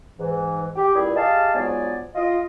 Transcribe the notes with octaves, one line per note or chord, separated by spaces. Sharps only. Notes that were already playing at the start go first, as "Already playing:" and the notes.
G#2 E3
G4
C#2 A#2 G3 E4 G#4
G4 G#4 D#5 F5 A5
G#2 F3 F#3 B3 D5 G#5
F4 D#5